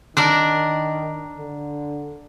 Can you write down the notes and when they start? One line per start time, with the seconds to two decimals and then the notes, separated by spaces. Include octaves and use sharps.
0.17 D#3 D4 A#4 D5
1.37 D3